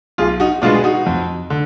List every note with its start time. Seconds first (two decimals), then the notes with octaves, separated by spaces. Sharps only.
0.18 B1 F4 G#4
0.40 D#4 F#4
0.62 B2 G#3 B3 D4 F4
0.75 G#4
0.84 D#4 F#4
1.06 F2
1.50 D3